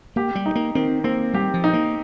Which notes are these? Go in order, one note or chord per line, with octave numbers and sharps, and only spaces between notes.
A#3 G4
G3
D#4
A#3
D#3 C4
A#3 C4
G3 G4
F3
D#4
A#3